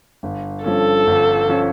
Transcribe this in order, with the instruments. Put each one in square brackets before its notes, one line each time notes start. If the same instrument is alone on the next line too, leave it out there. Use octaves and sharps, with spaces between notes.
[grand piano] G1
[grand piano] G2 F3 C#4 [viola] A4
[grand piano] G1
F3 C#4